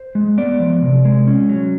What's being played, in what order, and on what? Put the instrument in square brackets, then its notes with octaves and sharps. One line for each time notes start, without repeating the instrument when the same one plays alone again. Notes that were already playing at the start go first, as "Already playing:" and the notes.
Already playing: [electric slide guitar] C5
G#3
B3 D5
F3
C3
G#3
C#4
F#3